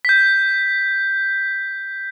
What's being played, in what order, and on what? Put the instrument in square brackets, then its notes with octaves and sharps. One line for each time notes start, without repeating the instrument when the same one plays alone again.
[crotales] G6 B6